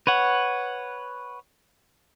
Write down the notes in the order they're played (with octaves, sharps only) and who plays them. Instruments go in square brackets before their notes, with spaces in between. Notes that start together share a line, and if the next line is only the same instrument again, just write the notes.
[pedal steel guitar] B4 C#5 F#5